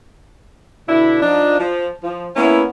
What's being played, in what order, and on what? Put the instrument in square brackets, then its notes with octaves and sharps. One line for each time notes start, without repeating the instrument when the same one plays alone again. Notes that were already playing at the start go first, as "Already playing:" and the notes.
[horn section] B2 D3 D4 E4
F3 D4 D#4
F3
F3
A#3 B3 C#4 E4